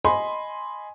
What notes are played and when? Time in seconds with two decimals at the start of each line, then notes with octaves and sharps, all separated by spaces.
0.05 D#5 G#5 B5 C6